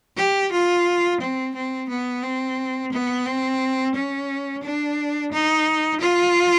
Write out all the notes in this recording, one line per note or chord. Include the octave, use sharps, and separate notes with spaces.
G4
F4
C4
C4
B3
C4
B3
C4
C#4
D4
D#4
F4